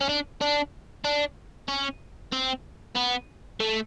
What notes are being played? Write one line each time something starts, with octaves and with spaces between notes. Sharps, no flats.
C#4
D4
D4
D4
C#4
C4
B3
A3